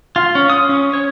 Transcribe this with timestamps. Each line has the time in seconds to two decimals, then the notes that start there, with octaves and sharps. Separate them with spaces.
0.16 F4
0.35 C#4
0.50 D#6
0.69 C#4
0.93 C#5